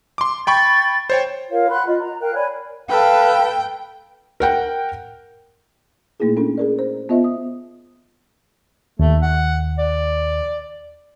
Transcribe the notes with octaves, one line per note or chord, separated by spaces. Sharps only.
C6 D6
G5 B5 C#6 A6
C5 C#5 G5
F4 A#4 C#5 F5
F#5 B5 C6 F#6
F4 D#5
A#5
A#4 F5 G5 F#6
C#5 D5 G#5 B5
A4 B4 F5 G5
A#4 F#5 G5
A#2 A3 A#3 D#4 E4 G#4
C#4 D4 A4
G#4 A#4 D5
C5
B3 F4 C5 D#5 E5
D#6
D#2 A3
F#5
D5